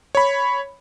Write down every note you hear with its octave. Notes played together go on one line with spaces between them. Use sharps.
C#5 B5